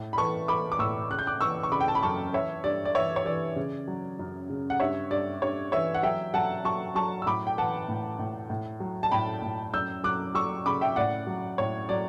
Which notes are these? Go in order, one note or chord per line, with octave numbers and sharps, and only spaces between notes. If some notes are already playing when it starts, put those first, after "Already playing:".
Already playing: A2
B5
E3 A5 C#6
E3 B5 D6
D6
A2 C#6 E6
C#3 F#6
G6
D6 F#6
E3 C#6 E6
C#6
C#3 B5 D6
G5
A5
B5
F#2 A5 C#6
E3 C#5 E5
G2 D5
D5
E3 C#5 E5
C#5
E3 D5
C#3
F#3
F#2
C#3
F#5
G2 C#5 E5
G2 D5
G2 C#5
E3 C#5 E5
F#5
F#3 E5 G5
F#3 F#5 A5
F#3 A5 C#6
F#3 A5 C#6
E6
A2 B5 D6
G5
E3 F#5 A5
A2
A2
A2
F#3
A5
A2 G5 B5
A2
F#2 E6 G6
F#3 D6 F#6
F#3 C#6 E6
C#3 B5 D6
E5 G5
A2 D5 F#5
F#3
A2 C#5
F#3 D5